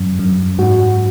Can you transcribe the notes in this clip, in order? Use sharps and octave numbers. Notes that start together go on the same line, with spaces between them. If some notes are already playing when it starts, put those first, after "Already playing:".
Already playing: F#2
F#2
G#2 F#4